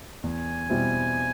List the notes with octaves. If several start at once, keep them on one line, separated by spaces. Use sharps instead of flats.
E2 G#5
B2 G3 C4 E4